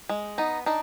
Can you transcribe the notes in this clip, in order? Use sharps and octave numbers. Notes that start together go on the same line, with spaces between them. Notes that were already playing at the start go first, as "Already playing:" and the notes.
G#3
B3 D#4
D4 D#4